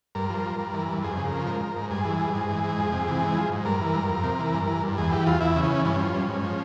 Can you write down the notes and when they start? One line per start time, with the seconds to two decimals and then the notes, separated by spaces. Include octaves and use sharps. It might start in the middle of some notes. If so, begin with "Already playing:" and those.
0.15 G2 A#4
0.30 F3
0.45 G2
0.59 G2
0.74 E3
0.89 G2
1.03 F2 G#4
1.17 C#3
1.25 A#4
1.32 F3
1.47 G#2 A#4
1.61 F3
1.76 G#2
1.91 G2 G#4
2.05 E3
2.19 G2
2.35 G#2
2.49 E3
2.64 G#2
2.79 F2
2.92 C3
3.08 E3
3.23 G#2
3.37 F3
3.52 G#2
3.65 G2 A#4
3.81 E3
3.95 G2
4.10 F2
4.24 C3
4.39 E3
4.54 G2
4.68 E3
4.83 G2
4.98 E2 G#4
5.11 E3 G4
5.26 E2 F4
5.41 E2 E4
5.56 C#3
5.63 C#4
5.71 E3
5.85 G2 C#4
5.99 F3
6.14 G2
6.28 G#2
6.44 F3